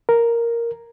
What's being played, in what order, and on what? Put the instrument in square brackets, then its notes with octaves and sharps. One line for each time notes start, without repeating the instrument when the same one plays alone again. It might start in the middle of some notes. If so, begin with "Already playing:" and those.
[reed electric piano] A#4